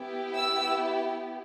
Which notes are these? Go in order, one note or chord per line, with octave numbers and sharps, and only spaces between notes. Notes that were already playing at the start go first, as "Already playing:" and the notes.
Already playing: B3 E4 G4
E6